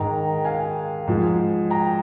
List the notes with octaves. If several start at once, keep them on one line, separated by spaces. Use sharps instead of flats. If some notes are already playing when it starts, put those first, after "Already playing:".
Already playing: G#2 D#3 G#3 G5 A#5
F5 G#5
G#2 F3 G#3
G5 A#5